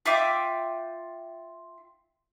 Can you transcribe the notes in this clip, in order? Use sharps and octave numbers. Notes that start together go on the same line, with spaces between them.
F4 E5 G5 D6